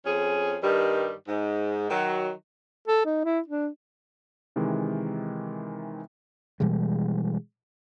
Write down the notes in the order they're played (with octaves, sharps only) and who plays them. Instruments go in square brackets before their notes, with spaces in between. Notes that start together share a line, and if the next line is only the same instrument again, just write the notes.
[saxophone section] F2 C#4 G#4
G2 D#3 G3
G#2
D#3 F#3
[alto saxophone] A4
D#4
E4
D4
[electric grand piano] C3 D#3 E3 G#3
[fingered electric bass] B2 E3 G3 G#3